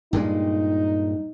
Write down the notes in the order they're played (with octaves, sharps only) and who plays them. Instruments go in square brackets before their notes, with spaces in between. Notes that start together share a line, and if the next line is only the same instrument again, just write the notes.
[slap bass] G2 A#2 G#3 [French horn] D#4